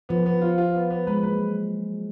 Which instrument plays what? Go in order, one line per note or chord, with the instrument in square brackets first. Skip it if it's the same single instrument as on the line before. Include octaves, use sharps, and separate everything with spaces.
[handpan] F3 [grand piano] B3
[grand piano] B3
F4
F4
B3
B3
[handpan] G#3 [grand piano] B4
[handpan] F#3 A#3 [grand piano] B4